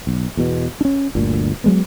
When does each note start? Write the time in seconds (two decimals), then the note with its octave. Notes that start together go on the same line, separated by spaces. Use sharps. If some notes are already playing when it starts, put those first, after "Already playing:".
0.07 B1
0.37 E2 B2
0.81 C#4 D4
1.15 G1 D2 A#2
1.64 F#3 G#3 B3